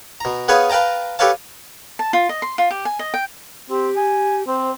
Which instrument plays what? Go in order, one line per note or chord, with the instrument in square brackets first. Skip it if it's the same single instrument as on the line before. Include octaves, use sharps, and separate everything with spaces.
[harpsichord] B2 A#5
B3 G#4 B4 C#5 F5
B4 F5 G5 A5 A#5
G4 A4 B4 C#5 F5 A5
[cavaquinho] A5
F4
D#5
C6
F4
G4
G#5
D#5
G5
[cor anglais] C4 [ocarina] G4
[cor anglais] G#5
[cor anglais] C4 [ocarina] C5